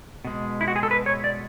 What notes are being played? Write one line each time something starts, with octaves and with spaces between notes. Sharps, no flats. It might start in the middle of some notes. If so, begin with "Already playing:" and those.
B2 G#3
E4
F#4
G#4
A4
B4
C#5
D5